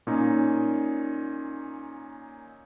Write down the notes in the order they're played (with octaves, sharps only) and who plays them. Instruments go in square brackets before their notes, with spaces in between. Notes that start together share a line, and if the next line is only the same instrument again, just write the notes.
[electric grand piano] A#2 C#4 D#4